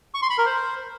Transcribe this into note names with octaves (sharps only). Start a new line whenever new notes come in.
C#6
C6
B5
A#4
C5